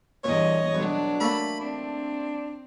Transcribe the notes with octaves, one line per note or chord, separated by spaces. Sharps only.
E2 G2 A#2 C#5 D#5
B1 F#3 D4
A3 A#3 B5
C4 D4